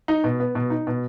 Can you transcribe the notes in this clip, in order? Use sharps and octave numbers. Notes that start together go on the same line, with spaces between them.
D#4
B2
B3
B2
D#4
B2